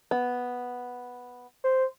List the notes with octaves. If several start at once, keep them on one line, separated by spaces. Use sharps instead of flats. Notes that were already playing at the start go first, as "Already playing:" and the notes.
B3
C5